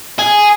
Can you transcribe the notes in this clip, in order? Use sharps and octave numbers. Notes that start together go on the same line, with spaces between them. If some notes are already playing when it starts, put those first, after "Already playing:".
G#4